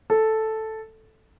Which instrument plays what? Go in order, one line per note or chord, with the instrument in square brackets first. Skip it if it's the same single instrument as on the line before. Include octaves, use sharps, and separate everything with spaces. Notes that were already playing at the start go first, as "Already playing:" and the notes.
[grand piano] A4